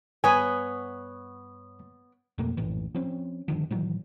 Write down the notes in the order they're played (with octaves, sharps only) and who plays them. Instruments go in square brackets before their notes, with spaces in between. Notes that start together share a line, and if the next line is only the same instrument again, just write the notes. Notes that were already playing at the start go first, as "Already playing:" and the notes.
[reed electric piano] G2 D#6 [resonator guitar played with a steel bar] B3 C#5 [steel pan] G#5
[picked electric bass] F2 B2 A3 A#3
A#1 F#2 A2 E3
F3 C4 C#4
G2 D3 D#3 F3
A2 D#3 E3 F#3